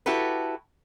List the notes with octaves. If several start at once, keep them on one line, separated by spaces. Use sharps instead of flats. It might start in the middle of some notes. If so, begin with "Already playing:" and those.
E4 F#4 G4 A4 B4